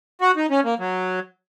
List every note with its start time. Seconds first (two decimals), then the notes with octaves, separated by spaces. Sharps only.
0.21 F#4
0.36 D#4
0.50 C#4
0.64 A#3
0.79 F#3